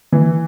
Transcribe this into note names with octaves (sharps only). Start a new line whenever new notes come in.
E3